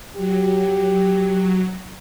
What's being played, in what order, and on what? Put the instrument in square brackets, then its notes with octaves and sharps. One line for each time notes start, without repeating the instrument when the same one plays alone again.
[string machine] F#3 [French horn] G4